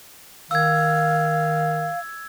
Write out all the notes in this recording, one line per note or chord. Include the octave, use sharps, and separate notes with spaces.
D#3 F5 E6 G#6